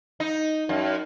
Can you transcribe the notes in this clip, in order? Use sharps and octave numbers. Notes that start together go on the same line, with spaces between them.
D#4
F#2